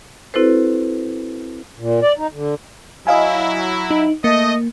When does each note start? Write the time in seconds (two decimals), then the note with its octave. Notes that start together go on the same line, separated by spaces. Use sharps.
0.34 C4 E4 F#4 A4 B4 C5
1.79 A#2
2.01 D5
2.18 D#4
2.33 D3
3.07 F#3 E4 D#5 F5 G#5
3.91 D#4
4.24 A3 A#3 D#5